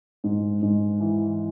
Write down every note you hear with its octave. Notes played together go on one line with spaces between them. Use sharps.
G#2
G#2
E3